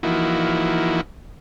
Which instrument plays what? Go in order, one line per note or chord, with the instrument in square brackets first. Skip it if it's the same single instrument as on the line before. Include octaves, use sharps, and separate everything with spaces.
[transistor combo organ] E3 F3 A#3 D#4 E4 F#4